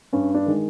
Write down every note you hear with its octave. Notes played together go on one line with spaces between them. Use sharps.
G2 C#4
D4
D#3 G#3